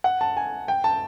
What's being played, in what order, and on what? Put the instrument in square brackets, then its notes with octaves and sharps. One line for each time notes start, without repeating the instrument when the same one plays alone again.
[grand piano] F#5
A5
G#5
G5
A5